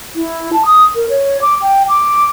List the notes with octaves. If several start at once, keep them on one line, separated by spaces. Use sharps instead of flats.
E4
A5
D#6
A#4
C#5
D6
G5
D6